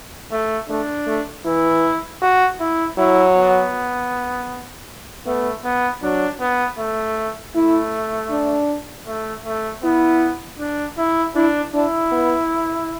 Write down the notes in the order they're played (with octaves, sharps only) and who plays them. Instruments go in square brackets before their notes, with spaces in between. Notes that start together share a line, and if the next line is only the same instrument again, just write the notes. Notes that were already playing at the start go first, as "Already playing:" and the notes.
[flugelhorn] A3
[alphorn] A3 [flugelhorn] D4
[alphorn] A3
[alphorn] E3 [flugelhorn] E4
[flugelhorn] F#4
E4
[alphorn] F#3 [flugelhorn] E4
[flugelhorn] B3
[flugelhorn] A3 [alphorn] B3
[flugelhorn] B3
[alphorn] F#3 [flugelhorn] D4
[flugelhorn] B3
A3
[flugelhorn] A3 [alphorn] E4
[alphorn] D4
[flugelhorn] A3
A3
[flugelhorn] B3 [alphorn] E4
[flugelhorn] D4
E4
[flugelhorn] D4 [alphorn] E4
[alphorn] D4 [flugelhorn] E4
[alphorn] B3